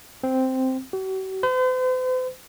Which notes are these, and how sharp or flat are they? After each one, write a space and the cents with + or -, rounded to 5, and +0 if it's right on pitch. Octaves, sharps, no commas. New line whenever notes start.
C4 -5
F#4 +45
C5 -45